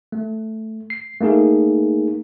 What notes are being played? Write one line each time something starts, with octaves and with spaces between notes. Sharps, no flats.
A3
C7
A3 A#3 D#4 G#4